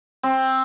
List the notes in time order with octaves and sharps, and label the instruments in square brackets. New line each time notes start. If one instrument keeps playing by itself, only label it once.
[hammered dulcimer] C4